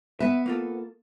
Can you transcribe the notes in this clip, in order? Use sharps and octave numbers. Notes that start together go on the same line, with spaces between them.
B3 B4 E5
A#3 F4 A4